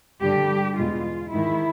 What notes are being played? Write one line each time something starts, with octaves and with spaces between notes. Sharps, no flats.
G2 D3 G3 G4
E2 B2 G#3 F4
G#2 D#3 G#3 E4